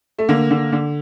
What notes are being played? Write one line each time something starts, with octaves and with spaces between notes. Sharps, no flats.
A3
D3 A#3
D3
D3